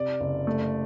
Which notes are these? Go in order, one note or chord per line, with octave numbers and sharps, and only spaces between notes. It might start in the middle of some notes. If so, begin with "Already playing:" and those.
Already playing: C3 D5
F#1
A3